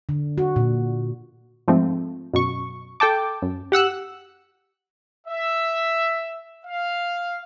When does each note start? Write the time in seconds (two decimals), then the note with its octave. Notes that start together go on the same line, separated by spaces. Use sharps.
0.09 D3
0.38 F#4
0.56 A#2
1.68 G#2 F3 A3 C4
2.34 F#2 B2 C#6
3.00 A4 G5 A5 D6
3.42 F#2
3.72 G4 F#5 E6 F#6
5.27 E5
6.66 F5